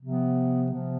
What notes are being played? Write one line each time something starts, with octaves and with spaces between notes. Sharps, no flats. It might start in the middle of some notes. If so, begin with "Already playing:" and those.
C3 F3 B3
C3 F3 B3